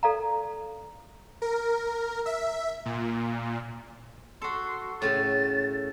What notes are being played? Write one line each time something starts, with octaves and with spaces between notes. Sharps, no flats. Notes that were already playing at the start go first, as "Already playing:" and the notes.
A4 D5 F5 A#5
A#4
E5
A#2
F#4 A4 C6
A2 C#3 G#5 A6